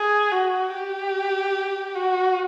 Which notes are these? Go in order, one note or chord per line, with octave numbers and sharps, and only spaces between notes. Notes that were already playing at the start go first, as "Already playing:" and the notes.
Already playing: G#4
F#4
G4
F#4